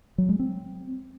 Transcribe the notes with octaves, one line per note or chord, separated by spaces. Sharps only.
F#3
G#3
C4